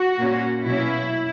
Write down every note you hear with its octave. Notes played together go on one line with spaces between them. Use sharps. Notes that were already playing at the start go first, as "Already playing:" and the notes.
Already playing: F#4
A#2 A#3 C#4
B2 F#3 A#3 C#4 E4